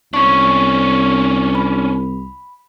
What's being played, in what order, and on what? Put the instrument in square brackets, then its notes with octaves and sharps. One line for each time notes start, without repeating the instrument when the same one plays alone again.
[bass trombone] C2 [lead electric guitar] C#4 D4 [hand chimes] C#6
[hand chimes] B5